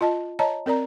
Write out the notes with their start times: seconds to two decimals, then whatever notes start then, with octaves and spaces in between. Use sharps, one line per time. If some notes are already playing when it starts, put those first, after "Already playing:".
0.01 F4 D#5 A5
0.39 C#5 D#5 A5 A#5
0.66 C4 A#4 D5 A#5